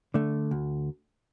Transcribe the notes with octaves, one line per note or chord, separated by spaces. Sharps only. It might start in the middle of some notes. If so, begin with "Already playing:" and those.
D3 A3
D2